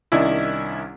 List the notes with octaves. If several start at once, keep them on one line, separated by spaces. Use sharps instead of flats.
C2 D#3 C#4 D4 E4